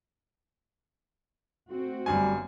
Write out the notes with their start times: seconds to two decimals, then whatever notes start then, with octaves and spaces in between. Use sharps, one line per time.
1.70 A3 C4 F#4
2.06 G1 F#2 G3 G#5